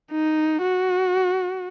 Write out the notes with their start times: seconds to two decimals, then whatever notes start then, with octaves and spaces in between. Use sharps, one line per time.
0.12 D#4
0.62 F#4